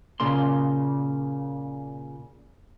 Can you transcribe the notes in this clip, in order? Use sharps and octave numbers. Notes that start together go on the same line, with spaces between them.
A#2 C#3 A#3 C6